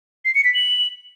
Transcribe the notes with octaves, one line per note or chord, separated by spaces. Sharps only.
C7
C#7
B6
F#7